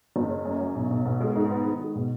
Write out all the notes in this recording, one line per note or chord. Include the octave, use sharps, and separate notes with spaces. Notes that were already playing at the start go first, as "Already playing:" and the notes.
F#1
C#4
F#2
F#3
B1
B1
B2
G#3
G#2
B3
D#3
G#3
B2